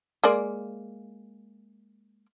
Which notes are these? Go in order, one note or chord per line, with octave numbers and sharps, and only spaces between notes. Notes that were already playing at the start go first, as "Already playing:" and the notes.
G#3 A#3 D5